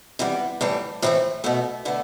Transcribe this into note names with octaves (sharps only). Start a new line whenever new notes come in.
C3 E3 G3 B3
A2 E3 G3
A2 E3 A3 C4
B2 A3 B3
D3 A3 B3